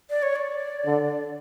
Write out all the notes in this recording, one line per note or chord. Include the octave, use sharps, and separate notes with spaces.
D5
C#5
D5
D3